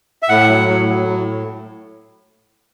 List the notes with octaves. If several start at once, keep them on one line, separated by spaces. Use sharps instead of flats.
E5
A2 F#5
F#3
A2
F#3
A2